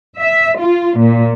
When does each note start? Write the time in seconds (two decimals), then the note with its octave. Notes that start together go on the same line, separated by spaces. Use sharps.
0.19 E5
0.59 F4
0.99 A#2